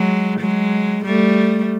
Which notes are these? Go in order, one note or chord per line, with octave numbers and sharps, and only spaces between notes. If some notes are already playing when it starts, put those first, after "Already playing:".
Already playing: F#3 G#3
F#3 G#3
G3 A3